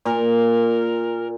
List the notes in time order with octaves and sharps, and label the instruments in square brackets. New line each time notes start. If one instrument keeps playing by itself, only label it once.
[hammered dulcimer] A#2 [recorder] A#4